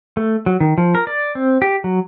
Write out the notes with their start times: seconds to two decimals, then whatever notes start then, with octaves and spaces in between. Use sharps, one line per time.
0.17 A3
0.46 F#3
0.60 D#3
0.78 F3
0.95 A#4
1.07 D5
1.35 C4
1.62 G4
1.84 F#3